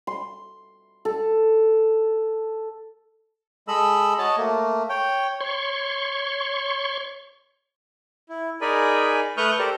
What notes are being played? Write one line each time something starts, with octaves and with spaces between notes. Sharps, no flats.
C6
A4
G#3 A4 D#5 B5 E6
F#4 C#5 D#5 A5
A3 A#3
C#5 G5
C#5 C6 C#6
E4
D#4 G#4 A#4 D5 G#5 B5
A3 B4 C#6 D#6 F6 G6
G4 A4 A#4 C5 D5